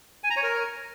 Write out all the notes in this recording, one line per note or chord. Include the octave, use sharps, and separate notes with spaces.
G#5
A#5
C#5
A#4